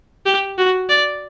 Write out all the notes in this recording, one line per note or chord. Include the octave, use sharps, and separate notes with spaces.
G4
F#4
D5